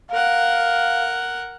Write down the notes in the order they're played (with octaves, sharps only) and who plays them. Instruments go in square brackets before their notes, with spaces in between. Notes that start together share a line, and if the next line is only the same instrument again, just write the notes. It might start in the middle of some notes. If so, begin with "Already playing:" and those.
[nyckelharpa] A#4 F#5 [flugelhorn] F5